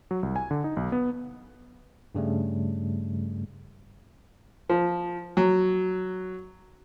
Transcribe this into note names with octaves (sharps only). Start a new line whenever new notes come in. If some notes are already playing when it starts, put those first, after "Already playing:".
F#3
C2
G#5
D3
D#4
B1
B3
G2 C#3 G3 A3
F3
F#3